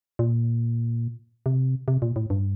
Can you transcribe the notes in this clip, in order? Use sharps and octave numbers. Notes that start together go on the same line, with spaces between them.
A#2
C3
C3
A#2
A2
G2